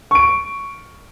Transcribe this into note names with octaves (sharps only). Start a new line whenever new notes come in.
C#6 D7